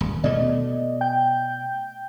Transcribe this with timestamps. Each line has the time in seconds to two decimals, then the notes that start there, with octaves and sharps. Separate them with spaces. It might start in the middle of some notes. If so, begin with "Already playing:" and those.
0.01 D#1
0.24 B2 A3 D5 D#5
1.01 G5 G6